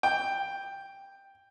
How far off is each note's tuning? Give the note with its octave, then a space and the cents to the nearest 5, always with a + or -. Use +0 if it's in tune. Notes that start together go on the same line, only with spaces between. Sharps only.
G5 +5